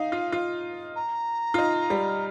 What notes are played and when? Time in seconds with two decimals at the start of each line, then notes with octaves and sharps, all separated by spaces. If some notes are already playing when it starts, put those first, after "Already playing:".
Already playing: D#4 F5
0.12 F4
0.32 F4
0.96 A#5
1.54 F4
1.58 D#4
1.90 G3